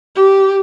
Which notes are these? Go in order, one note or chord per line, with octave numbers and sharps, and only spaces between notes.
G4